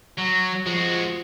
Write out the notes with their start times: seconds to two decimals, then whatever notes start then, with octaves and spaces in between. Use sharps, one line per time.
0.18 F#3
0.66 F3 G#3 F#4